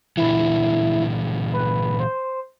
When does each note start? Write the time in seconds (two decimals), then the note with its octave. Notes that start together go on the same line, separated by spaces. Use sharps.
0.17 A#2 D3 E3 E4
1.53 B4
2.00 C5